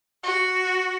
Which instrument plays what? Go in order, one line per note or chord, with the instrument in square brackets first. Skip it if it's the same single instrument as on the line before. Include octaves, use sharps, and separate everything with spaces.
[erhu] F#4